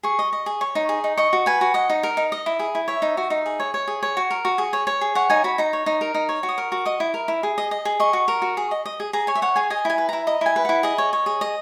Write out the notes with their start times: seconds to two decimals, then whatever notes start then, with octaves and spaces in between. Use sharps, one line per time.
0.03 G#4 C#6
0.19 D#5
0.33 D#5
0.46 G#4
0.61 C#5
0.75 D#4
0.89 G#4
1.04 D#4
1.17 D#5 C#6
1.33 F#4
1.46 B4 G#5
1.61 F#4
1.74 D#5 F#5
1.89 D#4
2.03 A#4
2.17 D#4
2.32 D#5
2.46 E4
2.59 G#4
2.75 E4
2.88 C#5 E5
3.02 D#4
3.17 F#4
3.30 D#4
3.46 G#4
3.60 C#5
3.74 C#5
3.88 G#4
4.03 C#5
4.17 F#4
4.31 A#4
4.45 F#4
4.58 G#4
4.73 C#5
4.87 C#5
5.01 G#4
5.15 C#5 F#5
5.30 D#4 G#5
5.44 F#4 B5
5.58 D#4 A#5
5.73 C#5
5.86 D#4
6.01 A#4
6.14 D#4
6.29 C#5
6.43 F#4
6.49 D#6
6.58 A#4
6.72 F#4
6.85 D#5 D#6
7.00 E4
7.14 A#4
7.28 E4
7.43 G#4
7.58 D#5
7.71 D#5
7.85 G#4
8.00 D#5 C#6
8.13 F#4
8.28 A#4
8.42 F#4
8.57 G#4
8.71 D#5
8.86 D#5
9.00 G#4
9.13 G#4 A#5
9.27 C#5 G#5
9.35 E5
9.42 C#5 F#5
9.56 G#4 G#5
9.70 D#5 G#5
9.85 E4 G#5
9.98 B4
10.09 E4 A#5
10.27 D#5 A#5
10.41 E4 G#5
10.56 B4
10.65 E4 F#5
10.83 G#4 D#5
10.98 C#5
11.13 C#5
11.26 G#4
11.41 D#5